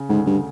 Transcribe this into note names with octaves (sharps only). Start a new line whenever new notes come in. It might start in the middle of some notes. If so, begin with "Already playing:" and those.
Already playing: C#3
D2 G#2
G2